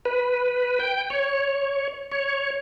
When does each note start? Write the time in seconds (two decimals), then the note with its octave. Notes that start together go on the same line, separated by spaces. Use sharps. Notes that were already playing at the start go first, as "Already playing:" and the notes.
0.05 B4
0.80 G5
1.10 C#5
2.12 C#5